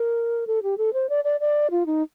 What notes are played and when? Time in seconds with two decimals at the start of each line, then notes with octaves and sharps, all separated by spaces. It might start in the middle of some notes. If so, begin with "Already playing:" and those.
Already playing: A#4
0.47 A4
0.63 G4
0.78 A4
0.93 C5
1.09 D5
1.24 D5
1.40 D5
1.71 F4
1.86 D#4